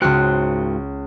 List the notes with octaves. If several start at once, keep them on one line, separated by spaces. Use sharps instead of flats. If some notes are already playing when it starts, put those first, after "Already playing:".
C#2 G#2 F#4 G5 F6 F#6